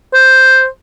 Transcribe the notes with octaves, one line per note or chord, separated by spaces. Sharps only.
C5